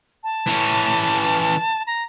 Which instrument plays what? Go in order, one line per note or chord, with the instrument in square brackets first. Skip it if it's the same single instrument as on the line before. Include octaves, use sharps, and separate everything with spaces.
[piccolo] A5
[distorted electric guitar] E3 C#4
[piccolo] A#5